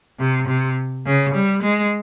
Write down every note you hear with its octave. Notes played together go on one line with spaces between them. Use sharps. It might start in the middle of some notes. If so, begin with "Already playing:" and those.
C3
C3
C#3
G3
G#3